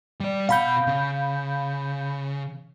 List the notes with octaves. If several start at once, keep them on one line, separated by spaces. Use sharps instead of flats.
G3 D5
B2 F5 F#5 B5 G6
C#3